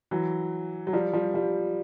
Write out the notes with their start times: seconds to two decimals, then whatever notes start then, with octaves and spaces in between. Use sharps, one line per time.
0.11 E3 F#3
0.87 F#3
0.93 F3 G3
1.13 F3 G3
1.34 F3 G3